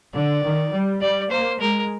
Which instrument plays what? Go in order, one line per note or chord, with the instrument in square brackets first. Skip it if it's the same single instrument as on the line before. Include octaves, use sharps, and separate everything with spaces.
[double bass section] D3 [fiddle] D5
[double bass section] D#3
G3
[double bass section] G3 [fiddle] D5
[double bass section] A#3 [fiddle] C5
[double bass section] G#3 [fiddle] A#4